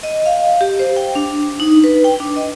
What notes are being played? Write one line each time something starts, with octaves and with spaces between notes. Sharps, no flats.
D#5
F5
G4
C5
G5
D4
D#4
B4
G5
D4
D#5